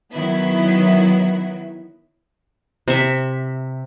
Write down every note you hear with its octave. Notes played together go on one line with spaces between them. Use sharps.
D#3 F#3 B3 E4
C3 E5